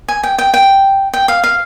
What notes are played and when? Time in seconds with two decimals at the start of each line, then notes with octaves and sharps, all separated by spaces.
0.08 G#5
0.23 G5
0.38 G5
0.54 G5
1.14 G5
1.28 F5
1.44 F5